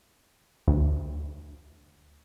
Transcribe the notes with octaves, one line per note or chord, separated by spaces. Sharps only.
D2